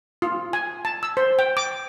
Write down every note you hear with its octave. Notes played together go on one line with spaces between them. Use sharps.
F4
G#5
A5
E6
C5
G5
D6